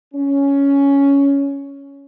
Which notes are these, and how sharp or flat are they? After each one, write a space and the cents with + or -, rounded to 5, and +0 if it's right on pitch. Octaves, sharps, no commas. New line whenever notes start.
C#4 +10